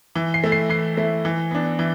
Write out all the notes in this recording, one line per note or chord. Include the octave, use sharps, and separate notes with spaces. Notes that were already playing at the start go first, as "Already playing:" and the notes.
E3
C7
A3 E4
C7
E3 C7
A3 E4
E3
B3 D4
E3